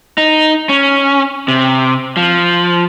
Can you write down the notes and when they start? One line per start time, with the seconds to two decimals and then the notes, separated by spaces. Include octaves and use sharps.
0.18 D#4
0.69 C#4
1.48 C3
2.17 F3